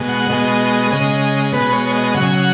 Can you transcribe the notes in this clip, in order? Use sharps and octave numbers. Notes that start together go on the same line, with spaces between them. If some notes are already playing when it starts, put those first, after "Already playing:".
Already playing: B2 G#3
F#5
B2 G#3 D#5
C#3 G#3
B2 G#3 B4
C#5
D#5
C#3 F#3 F#5
G#5
F#5